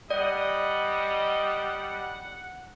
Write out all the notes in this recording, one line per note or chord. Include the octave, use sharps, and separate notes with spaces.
G3 D5 D#5 F#5